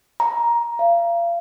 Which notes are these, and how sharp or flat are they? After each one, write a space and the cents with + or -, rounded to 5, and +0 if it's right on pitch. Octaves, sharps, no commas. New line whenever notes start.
A#5 +15
F5 -35